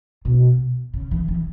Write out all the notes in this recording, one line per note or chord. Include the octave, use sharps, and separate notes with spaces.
B2
C#3
E3
E3